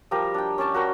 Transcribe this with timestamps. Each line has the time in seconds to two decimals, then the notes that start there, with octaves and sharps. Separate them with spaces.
0.11 F3 G3 G4 A#4
0.34 D4 G5
0.58 C#4 D5 A5 C#6
0.74 F#4 A#4 G5